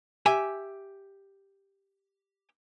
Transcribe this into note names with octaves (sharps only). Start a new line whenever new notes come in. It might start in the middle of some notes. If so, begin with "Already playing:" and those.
G4 E5 G#5